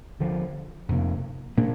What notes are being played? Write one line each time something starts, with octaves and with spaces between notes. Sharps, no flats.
D2 D3 F3
F2 C3 A#3
A#2 A#3 D4